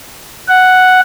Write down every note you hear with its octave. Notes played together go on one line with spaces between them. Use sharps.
F#5